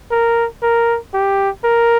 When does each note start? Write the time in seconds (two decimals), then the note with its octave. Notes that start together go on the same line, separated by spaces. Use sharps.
0.11 A#4
0.62 A#4
1.14 G4
1.64 A#4